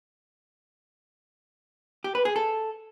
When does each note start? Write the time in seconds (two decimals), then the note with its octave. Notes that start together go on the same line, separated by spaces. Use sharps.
2.04 G4
2.15 B4
2.25 G#4
2.36 A4